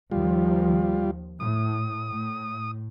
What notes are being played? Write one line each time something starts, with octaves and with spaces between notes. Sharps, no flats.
D#2 F3 G3 F4
A2 D#6
A2